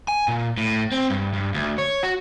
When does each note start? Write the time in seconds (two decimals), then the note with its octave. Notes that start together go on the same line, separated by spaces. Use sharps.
0.08 G#5
0.28 A#2
0.57 A2
0.92 C4
1.10 G2
1.33 G2
1.54 D2
1.78 C#5
2.03 F#4